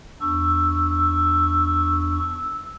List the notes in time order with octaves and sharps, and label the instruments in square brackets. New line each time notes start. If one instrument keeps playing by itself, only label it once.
[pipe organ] E2 D4 C#6 [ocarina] E6